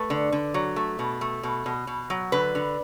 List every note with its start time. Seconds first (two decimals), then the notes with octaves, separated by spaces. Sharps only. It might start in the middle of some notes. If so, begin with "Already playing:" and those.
Already playing: A3 B4
0.10 D3
0.32 D3
0.54 F#3
0.76 A3
0.99 B2
1.21 A3
1.43 B2
1.66 B2
1.87 B2
2.10 F#3
2.32 D3 B4
2.55 D3